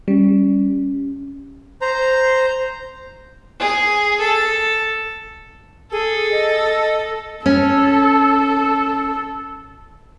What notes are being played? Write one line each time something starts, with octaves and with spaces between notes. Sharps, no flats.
G3 C#4
C5 A#5
G#4
A4
G#4 A4
D#5
C#4 A4